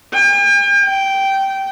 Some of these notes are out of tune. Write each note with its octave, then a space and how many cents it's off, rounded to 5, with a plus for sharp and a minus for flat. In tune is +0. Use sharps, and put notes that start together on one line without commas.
G5 +45
G5 -10